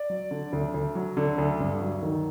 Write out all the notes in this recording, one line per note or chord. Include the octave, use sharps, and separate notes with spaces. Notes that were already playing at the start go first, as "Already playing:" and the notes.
Already playing: D5
F#3
D3
D2
D2
F#3
D3
D2
G2
F#3
D#3